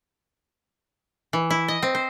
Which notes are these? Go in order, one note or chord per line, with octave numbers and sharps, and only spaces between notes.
E3
E4
D#5
C4
C5